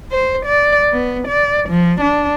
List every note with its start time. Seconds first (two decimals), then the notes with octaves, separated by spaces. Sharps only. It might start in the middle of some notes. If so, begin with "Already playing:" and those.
0.11 C5
0.46 D5
0.92 B3
1.28 D5
1.69 F3
2.01 D4